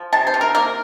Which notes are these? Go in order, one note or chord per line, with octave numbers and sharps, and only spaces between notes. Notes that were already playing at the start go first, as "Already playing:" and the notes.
Already playing: F3
C3 A5
C5
C3
A#4
A#3 A#4